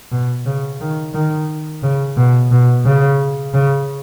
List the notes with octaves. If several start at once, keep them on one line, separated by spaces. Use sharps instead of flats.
B2
C#3
D#3
D#3
C#3
B2
B2
C#3
C#3